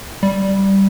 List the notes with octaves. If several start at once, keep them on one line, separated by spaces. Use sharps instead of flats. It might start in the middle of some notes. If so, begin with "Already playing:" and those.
G3